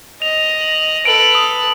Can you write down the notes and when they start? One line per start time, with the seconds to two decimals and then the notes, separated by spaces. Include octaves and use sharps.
0.22 D#5 F7
0.61 F#7
1.05 A4 B4 D7 F#7
1.35 D#6